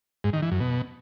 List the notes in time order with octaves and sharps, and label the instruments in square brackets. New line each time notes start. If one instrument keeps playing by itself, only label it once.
[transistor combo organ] G#2
D#3
E3
F#2
B2